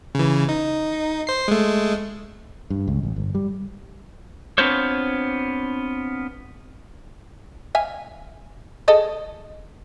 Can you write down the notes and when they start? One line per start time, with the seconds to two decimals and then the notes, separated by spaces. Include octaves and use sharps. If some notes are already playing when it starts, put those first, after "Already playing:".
0.15 C#3 E3
0.49 D#4
1.27 C5 C7
1.48 G#3 A3
2.70 G2
2.87 C#2
3.03 A1
3.16 G1
3.35 G3
4.58 B3 C4 D4 F4 C5 C#5
7.75 E5 F5 G#5
8.88 G#4 A4 D#5